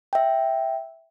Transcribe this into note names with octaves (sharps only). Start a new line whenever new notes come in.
E5 G5